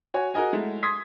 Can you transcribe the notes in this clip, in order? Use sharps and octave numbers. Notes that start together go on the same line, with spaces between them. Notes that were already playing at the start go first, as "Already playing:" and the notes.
F#4 C#5 G#5
F#4 G#4 A#4 D#5 G#5
G#3 A3 E4
C6 D#6 G#6 B6